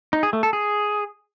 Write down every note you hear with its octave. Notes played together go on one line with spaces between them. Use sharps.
D#4
G#4
A3
A4
G#4